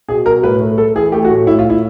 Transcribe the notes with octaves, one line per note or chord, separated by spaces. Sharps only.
B2 G#4
B2 A#4
A2 B4
A3
A3 A4
E3 G#4
A3 G4
F#4
A2
A2 E4
F4
A2
E4